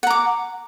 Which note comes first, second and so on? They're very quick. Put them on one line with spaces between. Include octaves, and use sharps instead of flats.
F#5 A#5 D6